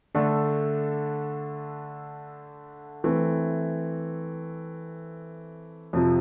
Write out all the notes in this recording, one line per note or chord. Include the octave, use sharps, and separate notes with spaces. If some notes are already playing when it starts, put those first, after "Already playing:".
D3 A3 D4 A4
E3 A3 C4
F2 C3 F3